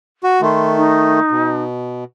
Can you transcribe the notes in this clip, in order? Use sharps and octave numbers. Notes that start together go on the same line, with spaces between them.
F#4
D#3 A3 C6
D#4
B2